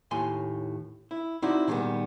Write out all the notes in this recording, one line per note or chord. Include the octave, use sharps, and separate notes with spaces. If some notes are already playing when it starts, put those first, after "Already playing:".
D#2 A2 G#5 C6
E4
C4 D#4 E4 F#4 C5 D5
A#2 D#3 F3 G3 G#3 B3